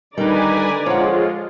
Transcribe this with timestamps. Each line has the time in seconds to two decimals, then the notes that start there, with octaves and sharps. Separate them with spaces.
0.18 D3 D#3 G3 D#4 B4 D5 G#5 A#5
0.86 F3 G#3 F4 C#5 F#5